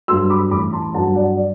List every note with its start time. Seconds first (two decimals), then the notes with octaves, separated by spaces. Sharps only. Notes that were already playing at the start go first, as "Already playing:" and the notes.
0.08 G2 F#3 C6 E6
0.30 B5 D6
0.51 A1 B5 D6
0.73 A5 C6
0.94 G2 F#3 F#5 A5
1.15 D5 F#5
1.37 D5